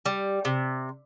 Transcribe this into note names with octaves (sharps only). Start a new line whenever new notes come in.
G3
C3